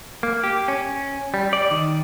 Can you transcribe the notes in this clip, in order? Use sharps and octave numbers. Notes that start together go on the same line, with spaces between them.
A#3
G4
C#4
G3
D5
D#3